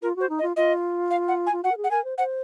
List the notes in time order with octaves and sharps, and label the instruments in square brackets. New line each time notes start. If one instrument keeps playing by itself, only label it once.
[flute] F4 [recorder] A#4
[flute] F#4 [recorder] C5
[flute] D#4
[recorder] D#5
[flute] F4
[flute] F4 [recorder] D#5
[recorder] F5
F#5
G#5
[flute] F4
[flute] F#4 [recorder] F#5
[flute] A#4
G#4
[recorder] F#5
[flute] A#4 [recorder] G#5
[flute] C5
[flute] C5 [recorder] F#5